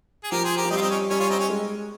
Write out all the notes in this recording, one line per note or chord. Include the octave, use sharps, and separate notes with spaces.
G#4
F3 G4 A#4
G#4 C5
G4 A#4
F3
G3 C4 D#4
F4
C4 D#4
C#4
G3 C#4
C#4 F4
C4 D#4
C#4
G#3